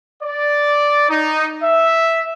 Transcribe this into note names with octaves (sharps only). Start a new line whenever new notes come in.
D5
D#4
E5